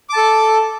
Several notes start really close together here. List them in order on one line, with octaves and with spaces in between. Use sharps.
D6 A5 A4